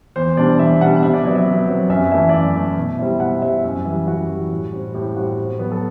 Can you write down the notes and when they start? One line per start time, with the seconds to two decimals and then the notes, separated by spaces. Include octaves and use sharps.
0.16 E2 C5
0.37 B2 G3 D4 D5
0.59 E2 E5
0.81 B2 G3 D4 F#5
1.02 C3 E5
1.14 D5
1.24 F#3 B3 E5
1.35 E5
1.46 C3
1.68 F#3 B3
1.89 F#2 E5
2.12 E3 A3 E4 E5
2.29 D5
2.33 F#2 E5
2.54 E3 A3 E4
2.77 B2
2.99 G3 C4 E4
3.20 B2 F#5
3.42 G3 C4 E4 E5
3.64 F#2 E5
3.85 E3 G3
4.07 F#2 F#4
4.29 E3 G3
4.51 A2
4.72 G3 C4
4.94 A2 G4
5.16 G3 C4 F#4
5.38 A2
5.59 F#3 B3
5.72 A4